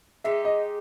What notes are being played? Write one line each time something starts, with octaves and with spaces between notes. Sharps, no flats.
G#3 D#4 G4 E5
D#5